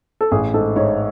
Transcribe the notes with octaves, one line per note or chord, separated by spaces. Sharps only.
A4
A1 G#4
G#2 A4
G#2 C#5